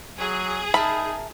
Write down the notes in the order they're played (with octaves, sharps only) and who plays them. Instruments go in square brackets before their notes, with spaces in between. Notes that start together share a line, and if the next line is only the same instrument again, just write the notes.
[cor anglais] F#3 [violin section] G#4
[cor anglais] D#4 [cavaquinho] A#4 E5 A5 [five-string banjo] B5